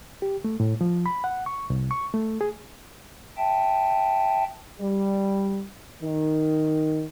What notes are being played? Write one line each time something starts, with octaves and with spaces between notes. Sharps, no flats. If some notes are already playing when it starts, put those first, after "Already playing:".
G4
A3
A2
F3
B5
F#5
C#6
C2
C#6
A3
G#4
E5 G5 A5
G3
D#3